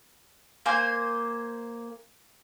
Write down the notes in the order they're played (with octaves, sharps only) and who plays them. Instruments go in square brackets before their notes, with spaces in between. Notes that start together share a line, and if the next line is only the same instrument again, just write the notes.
[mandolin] A#3 C5 G#5